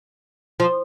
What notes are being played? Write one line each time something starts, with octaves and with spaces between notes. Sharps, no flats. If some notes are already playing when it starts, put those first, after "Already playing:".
F3